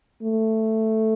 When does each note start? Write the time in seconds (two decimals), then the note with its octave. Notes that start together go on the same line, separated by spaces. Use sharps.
0.23 A3